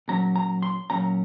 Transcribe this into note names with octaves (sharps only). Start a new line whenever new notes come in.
A#2 F#3 C#4 A#5
A#5
C6
A#2 F#3 C#4 A#5